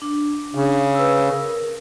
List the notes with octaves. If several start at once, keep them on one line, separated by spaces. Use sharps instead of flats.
D4
C#3
B4 E6
A#4